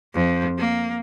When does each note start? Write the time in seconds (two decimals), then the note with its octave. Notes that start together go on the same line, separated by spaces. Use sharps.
0.14 F2
0.58 A#3